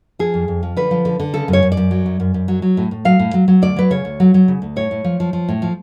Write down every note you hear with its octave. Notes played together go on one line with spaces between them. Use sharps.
F3 G#4
F2
F2
F3
D3 B4
F3
D3
D3
C#3 A4
F#2
C#5
F#2
D5
F#2
F#3
F#2
F#2
F#2
F#3
F#3
A2
A2
F#3 F5
A2
F#3
F#3
D2 D5
F#3 B4
C#3 C#5
D2
F#3
F#3
C#3
D2
A2 C#5
A2
F3
F3
F3
A2
F3